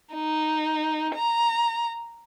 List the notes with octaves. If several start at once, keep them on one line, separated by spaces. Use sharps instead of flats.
D#4
A#5